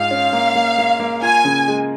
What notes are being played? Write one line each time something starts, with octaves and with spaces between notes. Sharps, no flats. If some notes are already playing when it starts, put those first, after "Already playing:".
Already playing: G#2 F4 F5
C#4
A#3
A#3
A#3
A#3
F4 G#5
C#3
G#3